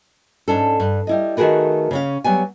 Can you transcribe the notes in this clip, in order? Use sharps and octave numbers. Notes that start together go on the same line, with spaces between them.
G#2 C#4 D4 A4
G2
G3 E4 D#5
D#3 A3 F#4 G#4 A#4 B4
C#3 C#4 F5
F#3 G3 B3 G#5